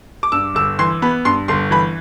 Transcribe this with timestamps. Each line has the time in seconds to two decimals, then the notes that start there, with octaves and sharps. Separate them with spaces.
0.23 D6
0.32 G2 E6
0.55 G1 E6
0.79 E3 C6
1.02 B3 B5
1.25 G2 C6
1.48 G1 C6
1.71 E3 B5